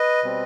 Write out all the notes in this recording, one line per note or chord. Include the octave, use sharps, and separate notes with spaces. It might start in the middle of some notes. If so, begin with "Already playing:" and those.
Already playing: B4 D#5
B2 G3 C4